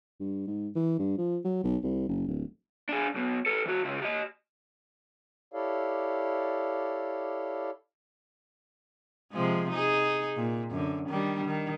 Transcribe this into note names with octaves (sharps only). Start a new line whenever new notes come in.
G2
G#2
E3
G2
F3
F#3
B1
C2
F#1
D1
D4 G#4
B1 B2
A4 B4
E3 F#4
C#3 F4
G4 D#5
E4 G4 A4 C#5 D5 F5
C3 F3 G#3
D#4 G#4
A#2
F#2 D3
D#3 G3 D4
D#3